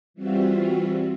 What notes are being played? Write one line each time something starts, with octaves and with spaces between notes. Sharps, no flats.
E3 G3 C4 F4 F#4 E5